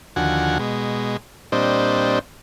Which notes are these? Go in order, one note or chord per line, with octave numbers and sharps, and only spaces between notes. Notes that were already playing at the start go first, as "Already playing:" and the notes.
D#2 D3 F3 F#4 F#5 G#5
B2 G#3
A#2 G3 C4 D4 C5 D#5